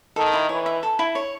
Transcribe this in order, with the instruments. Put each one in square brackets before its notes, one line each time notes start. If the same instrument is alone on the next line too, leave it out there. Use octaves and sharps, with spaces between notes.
[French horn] D#3 [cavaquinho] A4
[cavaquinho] E4
[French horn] E3 [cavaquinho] C#5
[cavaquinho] E5
A4
E4
C#5